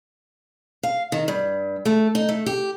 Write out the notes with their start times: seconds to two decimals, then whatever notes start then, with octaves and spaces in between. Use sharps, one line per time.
0.83 F5
1.12 D#3
1.28 G2
1.85 A3
2.15 D#4
2.29 A3
2.46 G4